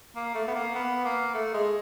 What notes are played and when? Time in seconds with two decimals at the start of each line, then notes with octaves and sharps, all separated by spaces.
0.16 A#3
0.35 A3
0.47 B3
0.55 A#3
0.75 B3
1.04 A#3
1.34 A3
1.54 G#3